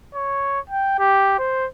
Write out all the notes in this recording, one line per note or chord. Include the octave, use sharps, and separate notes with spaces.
C#5
G5
G4
C5